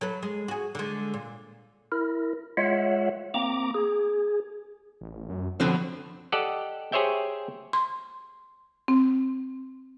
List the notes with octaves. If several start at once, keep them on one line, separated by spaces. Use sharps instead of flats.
F#3 A4 B4
G#3
F#4 G#4
D3 G#3
A#2
E4 A#4
G#3 F4 C#5 E5 F#5
A#3 C4 A#5 D6
G#4
A1
F#2
B2 D3 F3 F#3 C4
G4 A4 D5 D#5 F#5
G4 G#4 C5 C#5 E5 G5
C6
C4